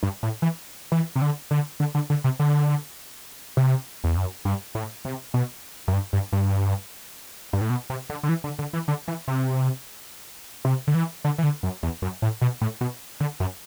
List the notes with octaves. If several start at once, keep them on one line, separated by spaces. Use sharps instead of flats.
G2
A2
E3
E3
C3
D3
D3
D3
D3
D3
C3
D3
C3
E2
F#2
G2
A2
C3
B2
F#2
G2
G2
G2
G2
A2
B2
C3
D3
D3
E3
D3
D3
E3
D3
E3
C3
C3
D3
E3
D3
E3
D3
F#2
E2
F#2
A2
B2
A2
B2
D3
F#2